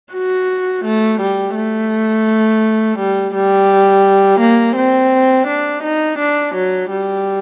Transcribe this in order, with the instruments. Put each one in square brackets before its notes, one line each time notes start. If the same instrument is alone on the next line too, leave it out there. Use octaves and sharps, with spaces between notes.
[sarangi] F#4
A3
G3
A3
G3
G3
A#3
C4
D4
D#4
D4
F#3
G3